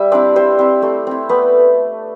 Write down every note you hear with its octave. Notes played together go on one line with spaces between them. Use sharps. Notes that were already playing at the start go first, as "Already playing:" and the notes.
Already playing: G3 E5
C4 D4 E4 D5
G3 C4 C5
C4 E4
A3
C4 E4
A3 B3 B4